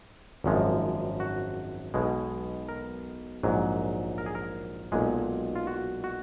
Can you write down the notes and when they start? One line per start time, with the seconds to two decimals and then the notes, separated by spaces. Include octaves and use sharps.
0.44 G#1 F#2 F3 G#3
1.20 F#4
1.94 B1 B2 G#3
2.69 A#4
3.43 A#1 G#2 F#3
4.18 A#4
4.26 G#4
4.35 A#4
4.92 B1 A#2 G#3 G#4
5.56 F4
5.67 F#4
6.04 F#4